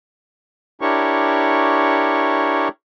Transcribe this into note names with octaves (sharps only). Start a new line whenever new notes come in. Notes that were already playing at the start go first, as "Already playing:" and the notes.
D4 E4 G4 A#4 C#5 C#6